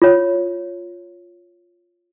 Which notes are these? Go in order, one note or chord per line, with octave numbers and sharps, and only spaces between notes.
F4 C#5